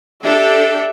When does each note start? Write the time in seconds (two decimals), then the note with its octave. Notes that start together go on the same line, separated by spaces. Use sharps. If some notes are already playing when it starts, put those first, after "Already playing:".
0.23 D4 G4 A4 E5